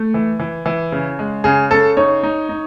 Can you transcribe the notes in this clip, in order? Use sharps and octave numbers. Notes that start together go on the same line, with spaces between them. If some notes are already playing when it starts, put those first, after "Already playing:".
Already playing: A3
E3
E3
E3
C#3
G#3
C#3 G#4
C#3 A4
D#4 C#5
D#4
D#4